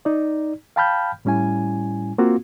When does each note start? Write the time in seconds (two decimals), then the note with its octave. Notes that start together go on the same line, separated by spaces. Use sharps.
0.05 D#4 D5
0.76 F5 G5 A5 B5 F6 G6
1.25 A2 G3 C#4 E4 G#5
2.18 A#3 C4 F4 F#4